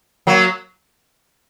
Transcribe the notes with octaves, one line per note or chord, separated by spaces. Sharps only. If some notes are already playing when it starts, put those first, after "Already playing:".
F#3 A#3